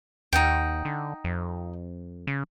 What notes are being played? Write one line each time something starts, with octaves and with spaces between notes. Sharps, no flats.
D#2 D#4 F#5 G5
D3
F2
C#3